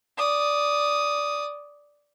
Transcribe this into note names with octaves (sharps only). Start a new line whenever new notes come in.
D5 D#6